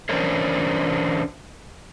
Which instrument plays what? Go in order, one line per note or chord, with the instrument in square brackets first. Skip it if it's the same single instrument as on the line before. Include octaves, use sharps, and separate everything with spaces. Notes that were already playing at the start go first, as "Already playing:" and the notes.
[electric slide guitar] E3 C#4 D4 A#4 C5 C#5